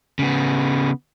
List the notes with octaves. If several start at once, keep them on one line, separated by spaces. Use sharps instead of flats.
C#3 B3